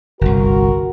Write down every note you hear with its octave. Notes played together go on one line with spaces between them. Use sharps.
G1 C2 F#4 A#4